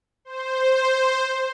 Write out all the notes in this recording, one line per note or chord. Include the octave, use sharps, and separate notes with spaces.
C5